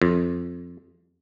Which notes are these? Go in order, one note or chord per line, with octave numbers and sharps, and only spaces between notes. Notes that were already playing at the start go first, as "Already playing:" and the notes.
F2